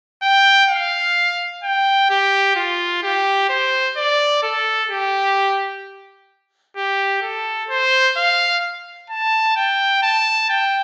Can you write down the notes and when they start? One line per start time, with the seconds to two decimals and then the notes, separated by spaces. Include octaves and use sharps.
0.22 G5
0.70 F5
1.63 G5
2.10 G4
2.56 F4
3.03 G4
3.49 C5
3.97 D5
4.43 A4
4.90 G4
6.76 G4
7.22 A4
7.69 C5
8.17 F5
9.10 A5
9.56 G5
10.03 A5
10.50 G5